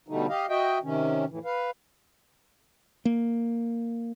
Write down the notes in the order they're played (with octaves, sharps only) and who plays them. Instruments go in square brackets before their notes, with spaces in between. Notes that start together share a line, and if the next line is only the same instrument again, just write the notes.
[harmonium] B2 D3 G3 A3 D#4
G4 D#5 F5
F#4 D#5 E5 G5
C3 D#3 C#4
F2 A2 E3
B4 F5
[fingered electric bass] A#3